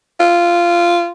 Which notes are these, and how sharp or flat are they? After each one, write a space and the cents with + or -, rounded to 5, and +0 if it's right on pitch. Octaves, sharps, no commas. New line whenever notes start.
F4 -15